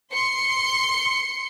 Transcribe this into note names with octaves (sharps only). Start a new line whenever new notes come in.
C6 C#7